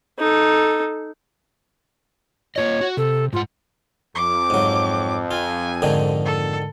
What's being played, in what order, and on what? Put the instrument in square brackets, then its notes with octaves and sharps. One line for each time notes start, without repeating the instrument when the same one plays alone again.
[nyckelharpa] D#4 A4
[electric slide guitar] A#3 F4 D#5 [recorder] C#5
[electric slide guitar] F#4 F#5
[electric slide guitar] C3 [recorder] A4
[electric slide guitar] G#2 F#5 [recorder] F4
[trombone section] F2 [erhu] D6
[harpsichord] G#2 F#3
[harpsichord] F4 [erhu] G#5
[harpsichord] G#2 D3 D#3
[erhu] A4